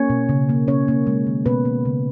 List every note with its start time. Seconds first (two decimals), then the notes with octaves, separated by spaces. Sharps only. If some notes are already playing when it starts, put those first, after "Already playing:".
Already playing: A#3 C#4 C#5
0.10 B2
0.29 C#3
0.49 A#3
0.68 C#3 C#4 C#5
0.88 A#3
1.07 G#3
1.27 D#3
1.46 B2 B3 B4
1.65 A#3
1.85 C#3